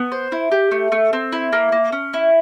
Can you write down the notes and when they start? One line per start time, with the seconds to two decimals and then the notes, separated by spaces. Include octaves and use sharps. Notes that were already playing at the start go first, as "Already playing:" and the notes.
Already playing: B3
0.12 C5
0.32 E4
0.52 G4
0.71 A3
0.92 A3
1.13 C4
1.32 E4
1.53 A#3
1.72 A#3
1.92 C#4
2.14 E4